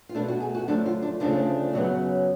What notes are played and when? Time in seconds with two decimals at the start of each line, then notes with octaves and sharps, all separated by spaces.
0.09 F4
0.15 B2 A3 D4
0.28 F#4
0.40 G#4
0.55 F#4
0.68 F#2 D3 F3 A3 D4
0.86 F4
1.02 D4
1.20 D2 C#3 F3 A3 D4
1.73 F#2 C#3 F#3 B3